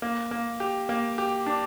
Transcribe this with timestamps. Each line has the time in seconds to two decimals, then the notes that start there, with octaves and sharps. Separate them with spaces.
0.02 A#3
0.31 A#3
0.60 G4
0.89 A#3
1.18 G4
1.46 D4